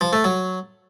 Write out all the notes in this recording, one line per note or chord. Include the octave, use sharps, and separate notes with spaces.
F3
A3
F#3